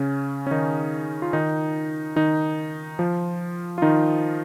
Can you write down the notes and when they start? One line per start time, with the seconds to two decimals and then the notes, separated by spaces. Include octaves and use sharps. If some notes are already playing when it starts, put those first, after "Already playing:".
Already playing: C#3 C#4
0.47 C#4
0.51 D#3 D#4
1.22 F4
1.33 D#3 D#4
2.16 D#3 D#4
2.99 F3 F4
3.78 F4
3.82 D#3 D#4